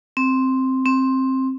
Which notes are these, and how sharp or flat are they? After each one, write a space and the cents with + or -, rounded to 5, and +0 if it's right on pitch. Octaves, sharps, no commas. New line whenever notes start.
C4 +0
C4 +10